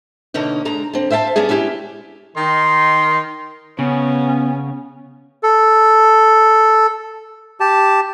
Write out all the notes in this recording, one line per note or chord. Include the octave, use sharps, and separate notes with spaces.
B2 D3 A#3 C#4 D#4
D3 G#3 A#5
D3 C4
C5 E5 F5 G5 A5
G3 B3 C#4 D4 G#4
G#3 C#4 E4 G4
D#3 D#4 C6
C#3 B3 C#4
A4
G4 A5